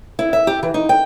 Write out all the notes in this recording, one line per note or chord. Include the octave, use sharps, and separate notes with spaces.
E4
E5
G4
E3
D#4
G5